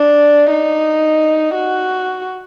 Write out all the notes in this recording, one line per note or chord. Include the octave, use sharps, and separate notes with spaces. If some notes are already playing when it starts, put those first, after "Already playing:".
Already playing: D4
D#4
F#4